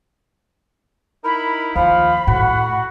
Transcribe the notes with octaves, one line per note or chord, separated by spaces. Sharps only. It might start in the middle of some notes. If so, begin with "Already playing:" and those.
D#4 E4 A#4 B5
D#2 F3 F5 B5
A2 F#4 F#5